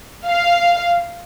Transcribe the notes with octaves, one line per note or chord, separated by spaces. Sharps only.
F5